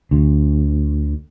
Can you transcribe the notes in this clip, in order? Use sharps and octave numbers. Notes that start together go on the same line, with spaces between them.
D2